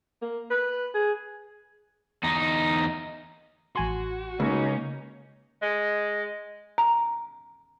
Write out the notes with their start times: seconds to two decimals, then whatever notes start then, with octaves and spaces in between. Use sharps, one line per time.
0.22 A#3
0.50 B4
0.95 G#4
2.23 E2 D#4
3.76 A1 F#4 G#5 C6
4.40 C#2 A#3 C#4 D#4
5.62 G#3
6.78 A#5